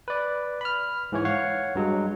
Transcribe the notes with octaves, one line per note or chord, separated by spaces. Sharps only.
B4 D5
B5 F6
G#2 E3 C#5
C#5 F5 F#5
G2 F#3 G#3